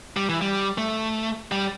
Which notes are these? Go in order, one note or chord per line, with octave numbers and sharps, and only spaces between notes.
G3
E3
G3
A3
G3